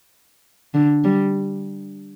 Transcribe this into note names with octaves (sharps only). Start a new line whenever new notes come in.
D3
G3